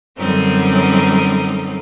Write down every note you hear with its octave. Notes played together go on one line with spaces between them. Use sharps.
F#2 D3 G3 C4 C#4 D#4